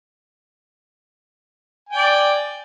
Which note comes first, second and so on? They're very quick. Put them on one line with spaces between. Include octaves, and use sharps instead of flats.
G#5 G5 D5